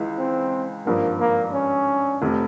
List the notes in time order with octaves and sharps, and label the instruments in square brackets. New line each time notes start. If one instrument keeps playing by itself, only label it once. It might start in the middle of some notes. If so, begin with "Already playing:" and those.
Already playing: [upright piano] C#2 E3 G#3
[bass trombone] C4
[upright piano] G#1 G2 F3 [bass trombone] A#3
[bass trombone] A#3
C#4
[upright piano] F1 C3